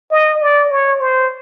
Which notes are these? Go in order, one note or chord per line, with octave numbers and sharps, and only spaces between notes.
D#5
D5
C#5
C5